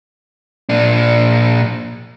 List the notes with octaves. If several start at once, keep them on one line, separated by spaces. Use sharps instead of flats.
A#2 D4